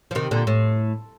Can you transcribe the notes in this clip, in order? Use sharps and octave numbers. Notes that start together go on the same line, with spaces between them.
F3
C3 D#3
A#2 D3
A2